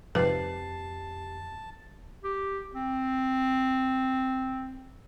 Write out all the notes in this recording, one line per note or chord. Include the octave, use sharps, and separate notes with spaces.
F2 G#2 C3 F3 G4 B4 A5 C7
G4
C4